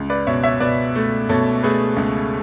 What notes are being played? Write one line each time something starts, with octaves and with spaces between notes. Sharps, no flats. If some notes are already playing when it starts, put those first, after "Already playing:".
Already playing: C#2
B4 D5
B2 C#5 E5
C#5 E5
B2 B4 D5
A3
B2 A4 C#5
A3 G#4 B4
C#2